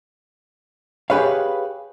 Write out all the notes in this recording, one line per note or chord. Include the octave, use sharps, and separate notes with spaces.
G4 G#4 B4 C#5 F5